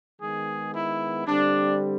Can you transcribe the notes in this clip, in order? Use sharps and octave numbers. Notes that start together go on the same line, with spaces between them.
D#3 G#3 B3 G#4
E4
D3 G3 C4 D4